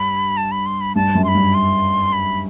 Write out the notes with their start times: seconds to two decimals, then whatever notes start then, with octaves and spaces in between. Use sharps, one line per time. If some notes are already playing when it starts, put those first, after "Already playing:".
Already playing: G2 B5
0.37 A5
0.52 B5
0.66 C6
0.81 B5
0.96 G2 A5
1.15 F#2
1.24 C6
1.28 B5
1.34 G2
1.54 C6
2.13 B5